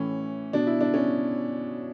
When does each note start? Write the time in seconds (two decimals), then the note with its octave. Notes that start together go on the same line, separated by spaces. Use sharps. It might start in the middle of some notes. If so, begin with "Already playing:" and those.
Already playing: A2 E3 C#4
0.53 B2 D4
0.67 E4
0.81 D4
0.94 C#4